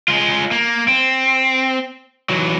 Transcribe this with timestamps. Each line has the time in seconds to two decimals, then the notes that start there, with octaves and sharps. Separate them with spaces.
0.08 G#3 F4
0.51 A#3
0.88 C4
2.29 E3 F#3